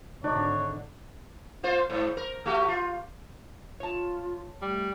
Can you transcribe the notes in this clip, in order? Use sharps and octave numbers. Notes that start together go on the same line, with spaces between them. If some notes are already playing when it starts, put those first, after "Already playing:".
G#1 D3 D4 D#4 C#5 D5
A#3 F4 C5
G#2
A#4
A3 F#4 G4
F4
F4 C#5 A5
G3 A3